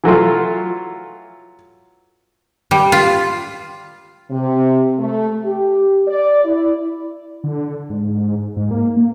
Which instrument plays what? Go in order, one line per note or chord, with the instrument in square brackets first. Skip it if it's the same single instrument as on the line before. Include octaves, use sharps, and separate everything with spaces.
[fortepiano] E3 F#3 A3 F4
[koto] G3
F4
[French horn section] C3
A3
G4
D5
E4
[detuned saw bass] D3
G#2
G#2
A#3
A#3